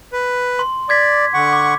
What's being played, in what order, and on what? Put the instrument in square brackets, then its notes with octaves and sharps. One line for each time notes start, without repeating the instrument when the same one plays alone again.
[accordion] B4
[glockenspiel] C6
[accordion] D5 [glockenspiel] D6 G#6 B6
[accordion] D3 F#5 C#6
[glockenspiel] D6